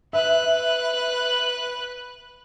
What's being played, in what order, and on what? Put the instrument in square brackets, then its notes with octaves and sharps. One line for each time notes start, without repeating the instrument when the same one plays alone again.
[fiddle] B4 F#6 [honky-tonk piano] E5